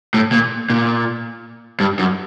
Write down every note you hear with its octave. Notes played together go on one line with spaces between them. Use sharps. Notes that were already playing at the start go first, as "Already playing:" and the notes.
A2
A#2
A#2
G2
F#2